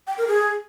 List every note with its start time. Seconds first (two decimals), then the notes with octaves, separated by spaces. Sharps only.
0.07 G5
0.18 A#4
0.27 G#4